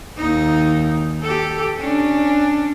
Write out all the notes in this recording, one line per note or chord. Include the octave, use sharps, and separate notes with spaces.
D#2 D#4
G4 A4
C#4 D4